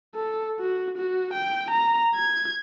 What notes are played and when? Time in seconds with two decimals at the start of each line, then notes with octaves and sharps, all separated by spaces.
0.15 A4
0.59 F#4
0.97 F#4
1.33 G5
1.70 A#5
2.15 G#6